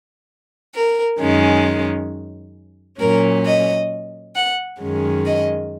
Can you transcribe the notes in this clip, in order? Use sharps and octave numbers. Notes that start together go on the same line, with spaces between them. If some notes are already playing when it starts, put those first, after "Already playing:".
A#4
F#2 D#3 G#3 C#4
A#2 F#3 C#4 A#4
D#5
F#5
F#2 D#3 G#3 C#4
D#5